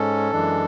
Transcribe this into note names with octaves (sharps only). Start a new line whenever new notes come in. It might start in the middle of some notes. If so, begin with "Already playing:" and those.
Already playing: G#2 G#3 C#4 A4
F#2 E3 G#3 D4